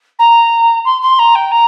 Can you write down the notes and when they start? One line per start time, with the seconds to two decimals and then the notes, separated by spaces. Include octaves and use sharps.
0.19 A#5
0.85 C6
1.02 C6
1.19 A#5
1.35 G5
1.51 A#5